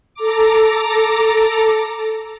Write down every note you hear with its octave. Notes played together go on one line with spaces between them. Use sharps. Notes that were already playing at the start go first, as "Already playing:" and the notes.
A4 A#5 D6